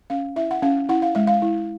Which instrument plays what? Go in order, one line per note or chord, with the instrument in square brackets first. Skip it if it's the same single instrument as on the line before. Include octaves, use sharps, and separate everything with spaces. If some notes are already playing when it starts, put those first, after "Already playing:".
[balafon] C#4 F5
E4 E5
F#5
C#4 F5
E4 F#5
F5
G#3 E5
F5
E4